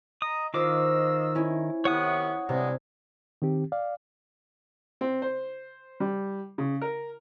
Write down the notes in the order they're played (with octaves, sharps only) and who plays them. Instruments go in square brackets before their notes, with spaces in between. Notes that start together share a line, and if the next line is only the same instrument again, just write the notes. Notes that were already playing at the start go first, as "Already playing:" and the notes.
[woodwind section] D#5 A#5 [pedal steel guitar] D#6
[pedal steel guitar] D#3 D6 [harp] F4 C5 [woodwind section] D#5 F5 E6
[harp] C#4 E4
[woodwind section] C3 D#3 B3 [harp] E4 [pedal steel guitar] C#5 F#5 D#6
[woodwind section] G2 G3 G#3 [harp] C3
[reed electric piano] D#3 C4 G4
D5 F5
[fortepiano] C4
C5
G3
C#3
A#4